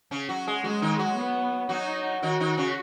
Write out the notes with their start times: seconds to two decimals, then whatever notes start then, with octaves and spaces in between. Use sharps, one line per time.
0.11 C#3 C#4
0.29 F#3 F#4
0.47 G#3 G#4
0.64 F#3 G#3 F#4
0.82 D#3 D#4
0.99 F#3 F#4
1.17 B3
1.69 F#3 D#4 F#4
2.22 D#3 D#4 F#4
2.40 D#3 D#4
2.57 C#3 C#4